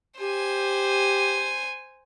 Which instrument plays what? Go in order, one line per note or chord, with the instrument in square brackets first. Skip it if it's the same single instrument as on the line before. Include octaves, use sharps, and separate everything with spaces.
[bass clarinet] G4 [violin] C5 G#5